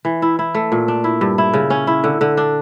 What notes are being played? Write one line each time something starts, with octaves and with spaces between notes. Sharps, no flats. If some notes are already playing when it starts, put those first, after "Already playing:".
E3
E4
E4
A3
A#2
D4
E4
G2
E4
C#3
C#4
E4
D3
D3
D4